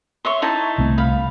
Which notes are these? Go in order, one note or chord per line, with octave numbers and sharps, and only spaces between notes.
C#5 E5 C6
D#4 E4 A5
C2 A3 C4
F5 B5